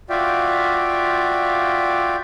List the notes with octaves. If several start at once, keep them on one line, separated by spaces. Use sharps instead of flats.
F4 F#4 D5 E5 F5 G5